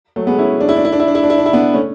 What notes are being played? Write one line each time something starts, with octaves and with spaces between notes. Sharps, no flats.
F#3 A3
G#3 B3
C#4 E4
D4
E4
D4
E4
D4
E4
D4
E4
D4
E4
D4
E4
B3 D4
A3 C#4